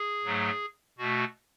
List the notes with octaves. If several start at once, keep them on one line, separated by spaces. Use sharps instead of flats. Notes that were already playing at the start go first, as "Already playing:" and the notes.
Already playing: G#4
G#2 F#3 A3
B2 A3 F#4